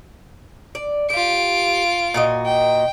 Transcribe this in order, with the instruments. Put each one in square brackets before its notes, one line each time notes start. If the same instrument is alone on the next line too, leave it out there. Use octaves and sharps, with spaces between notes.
[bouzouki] D5
[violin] F4 D7 [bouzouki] G4
[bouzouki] A#2 F#4 D#5
[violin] G5